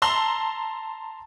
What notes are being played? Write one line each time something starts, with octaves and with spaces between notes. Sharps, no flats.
A5 A#5 C6 E6 F#7